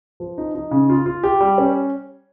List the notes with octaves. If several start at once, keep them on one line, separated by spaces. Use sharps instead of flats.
F3
D#4
D#4
C#3
F4
F4
G4
G3
C#4